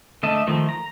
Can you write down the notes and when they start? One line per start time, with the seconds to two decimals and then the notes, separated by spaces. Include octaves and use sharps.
0.23 D3 A3 D#5 E5 A5
0.47 D#3 F3 A3
0.69 A#5